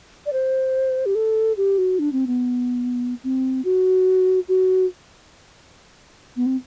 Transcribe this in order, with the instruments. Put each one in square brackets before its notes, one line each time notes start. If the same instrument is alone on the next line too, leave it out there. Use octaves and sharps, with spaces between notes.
[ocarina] D5
C5
G4
A4
G4
F#4
D4
C4
B3
C4
F#4
F#4
B3
C4